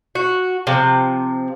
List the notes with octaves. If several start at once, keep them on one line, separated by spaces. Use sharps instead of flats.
F#4
C3 F3